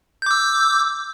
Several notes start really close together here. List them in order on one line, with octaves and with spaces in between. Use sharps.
G6 D6 E6